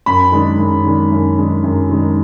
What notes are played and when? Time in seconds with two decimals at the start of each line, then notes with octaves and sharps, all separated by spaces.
0.06 F#2 B5
0.32 D#3 G#3 D4
0.58 F#2
0.85 D#3 G#3 D4
1.12 F#2
1.37 D#3 G#3 D4
1.64 F#2
1.90 D#3 G#3 D4